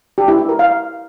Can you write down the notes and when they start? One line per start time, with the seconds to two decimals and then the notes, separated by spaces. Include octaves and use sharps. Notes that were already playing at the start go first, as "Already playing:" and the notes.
0.18 G4
0.28 E4
0.39 E4
0.49 A#4
0.59 F5